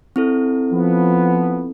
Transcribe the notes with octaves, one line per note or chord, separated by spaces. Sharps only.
C4 E4 A4
F3 B3